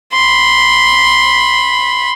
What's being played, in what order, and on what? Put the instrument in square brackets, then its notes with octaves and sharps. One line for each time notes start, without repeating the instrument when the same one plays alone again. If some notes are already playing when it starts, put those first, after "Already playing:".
[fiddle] B5 C6